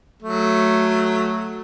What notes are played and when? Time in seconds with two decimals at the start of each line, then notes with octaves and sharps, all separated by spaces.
0.22 F#3 A3